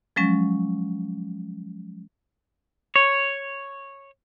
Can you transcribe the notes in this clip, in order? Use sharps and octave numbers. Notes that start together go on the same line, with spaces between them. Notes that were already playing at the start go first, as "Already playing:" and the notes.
F3 F#3 G#3 C#4
C#5